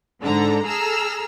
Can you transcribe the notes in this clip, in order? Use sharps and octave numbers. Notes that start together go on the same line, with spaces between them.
G#2 D3 A4 A#5
G#4 A4 A#5 E6 F6